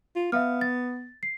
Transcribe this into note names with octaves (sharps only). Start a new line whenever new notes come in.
F4
B3 E5 F5 F6
A6
C7